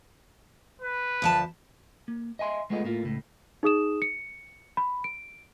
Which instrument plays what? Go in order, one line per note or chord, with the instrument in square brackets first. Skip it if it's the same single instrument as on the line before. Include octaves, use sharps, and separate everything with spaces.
[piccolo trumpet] B4
[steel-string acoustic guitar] D2 F3 A5
[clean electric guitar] A#3
D#5 E5 G#5 C6
G#3 A3 B3 F4 G#4 D#5
A2 A#3 F4
C#2 A2
[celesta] D#4 G#4 D#6 E7
C#7
B5
D7